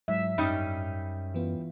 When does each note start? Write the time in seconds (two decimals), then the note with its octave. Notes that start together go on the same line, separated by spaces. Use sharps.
0.08 G#2 F#3 E5
0.38 F#2 G3 C#4 D#4
1.34 E3 B3 F4